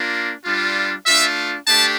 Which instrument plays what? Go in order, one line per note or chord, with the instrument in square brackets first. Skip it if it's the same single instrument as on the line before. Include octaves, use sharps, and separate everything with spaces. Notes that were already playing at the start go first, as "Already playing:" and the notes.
Already playing: [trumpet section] A#3 D4 F4
G3 D4 F4
A3 D4 F4 E5
A3 D4 G4 A5